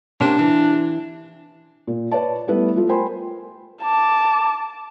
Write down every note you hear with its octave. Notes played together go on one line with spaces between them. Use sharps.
C3 A#3 C#4 D4
E3
A#2
B4 C#5 D5 A5
G3 A3 B3 E4 B4
F3 A3 F4
A#4 C5 G5 G#5 B5 C6
A5 D6